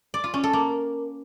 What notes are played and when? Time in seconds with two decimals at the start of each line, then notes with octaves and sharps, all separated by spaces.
0.14 D5
0.24 F4
0.34 C#4
0.44 A4
0.53 A#3